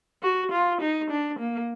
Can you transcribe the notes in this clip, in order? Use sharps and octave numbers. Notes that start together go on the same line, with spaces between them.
F#4
F4
D#4
D4
A#3